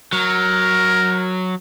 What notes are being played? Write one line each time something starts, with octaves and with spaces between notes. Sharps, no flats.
F#3 A#4